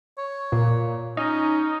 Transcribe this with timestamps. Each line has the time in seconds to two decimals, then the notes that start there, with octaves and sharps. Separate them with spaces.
0.18 C#5
0.52 A#2
1.17 C#4 D#4